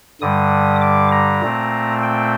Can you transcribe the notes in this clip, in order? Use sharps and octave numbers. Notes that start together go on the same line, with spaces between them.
G2 D3 G3 D#6
D6
A#5
A#2 A3 C4
G5